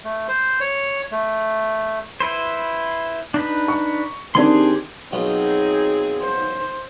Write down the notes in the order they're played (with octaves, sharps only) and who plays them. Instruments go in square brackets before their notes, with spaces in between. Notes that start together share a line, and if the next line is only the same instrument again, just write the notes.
[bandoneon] A3
C5
C#5
A3
[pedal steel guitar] E4 B4 C5
D4 D#4 B4
[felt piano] C#6
[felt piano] D#3 C4 D4 [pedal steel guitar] G4 G#4 C6
[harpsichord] B2 F#3 F4 [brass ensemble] C4 D#4 G#4
[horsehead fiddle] C5